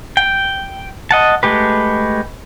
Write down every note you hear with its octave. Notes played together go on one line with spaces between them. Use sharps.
G5
D#5 F#5 A5
G#3 A3 G4 B4